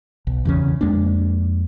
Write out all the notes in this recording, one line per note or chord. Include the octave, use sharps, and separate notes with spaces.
B1
E2 C#3 C#4
F2 G#3 A#3 D4